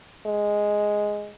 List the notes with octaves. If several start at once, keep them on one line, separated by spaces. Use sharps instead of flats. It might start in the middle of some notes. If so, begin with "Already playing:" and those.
G#3